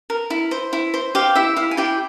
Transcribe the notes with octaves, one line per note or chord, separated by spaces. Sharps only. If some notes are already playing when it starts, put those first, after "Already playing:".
A#4
E4
C5
E4
C5
G4 F5
E4 E5
E4 F5
G#5
E4 G4 G5